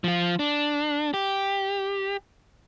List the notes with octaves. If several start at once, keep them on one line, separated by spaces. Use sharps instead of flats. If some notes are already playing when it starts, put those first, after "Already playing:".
F3 F4
D4
G4